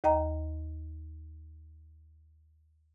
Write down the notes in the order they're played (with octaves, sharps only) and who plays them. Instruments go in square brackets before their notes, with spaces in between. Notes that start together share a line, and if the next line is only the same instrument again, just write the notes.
[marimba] D#2 D#5 G5 A#5